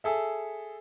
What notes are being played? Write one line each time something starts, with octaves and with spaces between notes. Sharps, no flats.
G#4 A4 E5